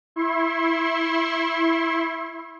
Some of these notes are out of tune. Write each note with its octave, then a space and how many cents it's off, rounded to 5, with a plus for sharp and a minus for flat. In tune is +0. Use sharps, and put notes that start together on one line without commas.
E4 +0 C6 +45